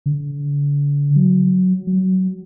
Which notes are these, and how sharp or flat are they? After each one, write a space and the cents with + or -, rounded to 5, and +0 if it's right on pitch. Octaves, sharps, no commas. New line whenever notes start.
D3 -40
F#3 +0
F#3 +20